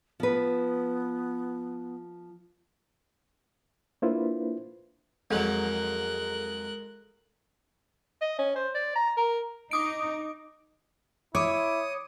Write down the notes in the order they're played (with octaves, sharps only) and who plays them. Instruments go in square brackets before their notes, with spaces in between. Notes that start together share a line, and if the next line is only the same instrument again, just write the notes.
[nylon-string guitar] F3 B4 [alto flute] B3
[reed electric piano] A#3 D4 E4 F4 B4 C5
[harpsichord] F2 F#3 [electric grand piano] G#3 [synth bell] A4 [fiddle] A#4 F#6
[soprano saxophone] D#5
C#4
C5
D5
A#5
A#4
[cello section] D#4 [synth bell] D6 D#6 D7
[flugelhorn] E4 [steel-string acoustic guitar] C#5 [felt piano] D6 [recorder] D#6